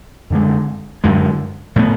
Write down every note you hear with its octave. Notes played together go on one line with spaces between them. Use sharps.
F#2 D3 G#3
F#2 D3 G#3
A2 G#3 B3